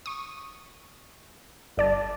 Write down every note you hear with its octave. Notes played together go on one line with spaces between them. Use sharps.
C#6 D#6
G1 D5 A5